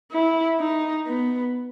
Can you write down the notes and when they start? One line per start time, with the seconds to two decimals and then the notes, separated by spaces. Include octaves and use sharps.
0.12 E4
0.60 D#4
1.07 B3